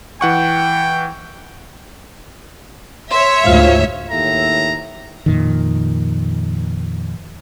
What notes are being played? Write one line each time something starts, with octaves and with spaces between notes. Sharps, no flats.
E3 F#5 G5 C#6
C#5 E5 C6
D2 G#2 F4 C5 F5
D#2 A2 E5 A#5
F2 A#2 D#3